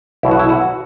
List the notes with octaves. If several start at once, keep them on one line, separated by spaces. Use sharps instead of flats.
B1 B2 E4
F#4
E4
F#4